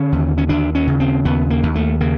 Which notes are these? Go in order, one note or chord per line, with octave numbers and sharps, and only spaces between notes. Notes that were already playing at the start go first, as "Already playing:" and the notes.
Already playing: D3 C#4
D#2
C#4
D#2 D4
C#4
C#3
C4
D#2 B3
A#3
D#2
A3
C#3 A#3